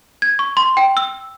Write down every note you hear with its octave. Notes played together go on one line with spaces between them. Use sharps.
G#6
C#6
C6
G5
E6